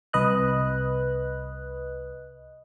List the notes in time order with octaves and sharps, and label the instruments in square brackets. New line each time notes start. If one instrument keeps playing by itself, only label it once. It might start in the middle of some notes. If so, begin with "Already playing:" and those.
[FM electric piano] C2 B4 D#5 F#6